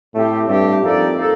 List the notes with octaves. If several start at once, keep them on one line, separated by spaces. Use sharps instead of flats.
A2 A3 C4 G4
G2 A3 C4 G4
F2 A#3 D#4 A4 D5
A#3 D#4 A4